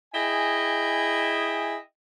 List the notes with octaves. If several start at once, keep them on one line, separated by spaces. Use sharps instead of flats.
E4 G#4 D#5 G5 G#5